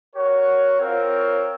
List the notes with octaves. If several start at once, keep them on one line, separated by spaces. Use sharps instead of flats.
F#4 A#4 C#5
C4 F4 A#4 C#5 F5